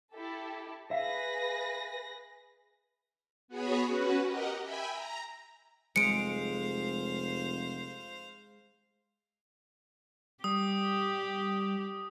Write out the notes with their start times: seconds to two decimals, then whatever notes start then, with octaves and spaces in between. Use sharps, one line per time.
0.15 E4 G4 A4
0.91 G#4 B4 E5 F5 A#6
3.48 B3 F#4 G#4 C#5 B5
3.86 C#4 F#4 B4
4.24 G4 A#4 D#5 F#5
4.61 E5 G5 G#5 B5
4.91 A#5
5.96 F1 G#3 C5 F5 C#7 D7
10.44 G3 G4 D#6